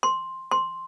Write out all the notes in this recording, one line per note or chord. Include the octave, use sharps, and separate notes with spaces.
C6
C6